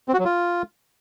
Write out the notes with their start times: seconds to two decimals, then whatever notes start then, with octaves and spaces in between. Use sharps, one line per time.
0.08 C4
0.14 F#4
0.19 F#3
0.25 F4